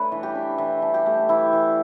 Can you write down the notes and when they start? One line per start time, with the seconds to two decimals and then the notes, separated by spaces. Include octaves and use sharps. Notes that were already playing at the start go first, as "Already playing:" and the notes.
Already playing: A3 D4 B4 C#5
0.12 E3
0.23 G4
0.35 D4
0.58 E3
0.82 D4
0.94 G4
1.06 A3
1.29 E3 E4
1.53 E3